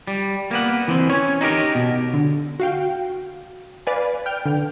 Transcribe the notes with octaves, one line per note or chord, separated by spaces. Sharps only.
G3
A#3 B3 F#5
E3 C4
C#4 C#5
D#4 E4 G4 A#4
B2
D3
F#4 F5 G5
B4 D5 F5 G#5
G5 F6 G6
D3